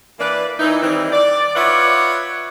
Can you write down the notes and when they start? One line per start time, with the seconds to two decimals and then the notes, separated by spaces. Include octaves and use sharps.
0.19 E3 A#3 B4 D5
0.59 E3 D#4
0.81 D#3 E3 G3 C4 D#4
1.12 D5
1.54 F4 B4 C#5 D5 E5 F#5